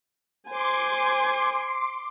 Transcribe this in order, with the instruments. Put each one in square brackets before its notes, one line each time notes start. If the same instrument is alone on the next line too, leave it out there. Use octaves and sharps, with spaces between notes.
[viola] C5 G#5 [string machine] C6 D6